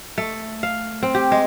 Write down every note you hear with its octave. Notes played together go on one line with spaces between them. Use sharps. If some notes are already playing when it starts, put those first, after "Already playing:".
A3
F5
C4
G4
G#3